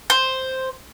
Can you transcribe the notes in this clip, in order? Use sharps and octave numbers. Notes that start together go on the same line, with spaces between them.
C5